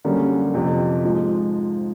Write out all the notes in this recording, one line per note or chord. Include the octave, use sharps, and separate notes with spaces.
F#2 D3 G3 A#3 C#4
F2 C3 F3
G#2 F3 G#3